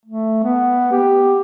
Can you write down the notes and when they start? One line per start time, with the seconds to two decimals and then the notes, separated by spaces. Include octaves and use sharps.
0.06 A3
0.43 B3
0.92 G4